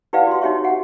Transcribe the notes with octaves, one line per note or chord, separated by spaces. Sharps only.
E4 G4 B4 D5 F5 F#5
F#4 C6
D#4 F#4 G4 C#5 E5 C#6
F#4 G4 F#5